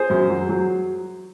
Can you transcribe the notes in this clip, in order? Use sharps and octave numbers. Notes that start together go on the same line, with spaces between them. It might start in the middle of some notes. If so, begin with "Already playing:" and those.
Already playing: G#4 C5
F#2
F#3
F#3